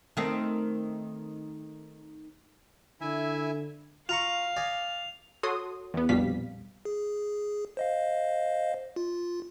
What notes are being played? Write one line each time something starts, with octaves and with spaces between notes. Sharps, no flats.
D#3 A3 C4
D3 E4 E5 G#5
F4 F5 A#5 C#6 F7
D5 D#5 G#5
F#4 A4 C#5 C6 D#6
E2 B3
A#1 F2 B2 G3 F5 B6
G#4
C5 D#5 F5
F4